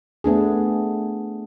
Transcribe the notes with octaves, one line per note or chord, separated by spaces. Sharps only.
A3 B3 D4 G#4